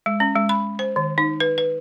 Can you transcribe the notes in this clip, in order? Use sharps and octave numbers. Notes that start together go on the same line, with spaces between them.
G#3
C#4
G#3
B5
C5
D#3
D#4
B4
B4